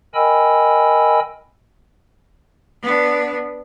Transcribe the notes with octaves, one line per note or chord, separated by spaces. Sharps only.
A#4 D#5 G5 G#5 B5 E6
B3 D4